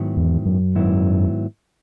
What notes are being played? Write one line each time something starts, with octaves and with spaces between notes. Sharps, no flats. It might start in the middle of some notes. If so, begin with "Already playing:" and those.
Already playing: G#2 D#3 F#3 B3 E4
E2
F#2
G#2 D#3 F#3 B3 E4